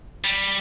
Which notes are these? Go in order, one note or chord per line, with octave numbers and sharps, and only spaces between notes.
G3